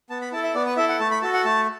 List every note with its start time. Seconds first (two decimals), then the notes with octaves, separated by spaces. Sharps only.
0.10 B3 A5
0.21 B5
0.32 E4 A5
0.36 A4
0.44 E5
0.55 B3 D5
0.66 B4
0.77 E4 A4 E5
0.89 F#5
1.00 A3 A5
1.11 B5
1.22 F#4 A4 A5
1.34 F#5
1.45 A3 A5